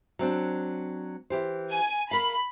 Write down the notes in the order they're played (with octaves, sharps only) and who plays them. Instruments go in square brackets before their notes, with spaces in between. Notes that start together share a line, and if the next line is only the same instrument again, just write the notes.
[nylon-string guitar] F#3 C4 D4
E3 G4 C5
[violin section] G#5
[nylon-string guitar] A#4 F5 [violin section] B5